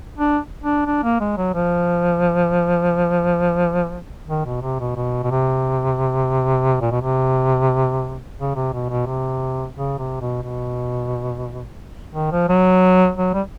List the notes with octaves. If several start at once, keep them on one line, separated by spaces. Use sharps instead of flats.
D4
D4
D4
A#3
G#3
F#3
F3
D#3
B2
C3
B2
B2
B2
C3
A#2
B2
C3
C#3
C3
B2
B2
C3
C#3
C3
B2
B2
D#3
F3
F#3
F#3
G3